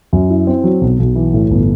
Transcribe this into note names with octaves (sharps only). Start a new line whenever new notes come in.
F#2
E4
C4
F#3
B1
B1
E3
A2
G1